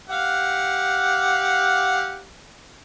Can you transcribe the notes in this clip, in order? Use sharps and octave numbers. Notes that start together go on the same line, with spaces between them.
G4 F5 F#5